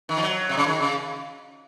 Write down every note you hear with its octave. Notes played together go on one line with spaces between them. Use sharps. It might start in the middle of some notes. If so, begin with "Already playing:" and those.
D#3
F3
F#3
C3
C#3
D#3
C#3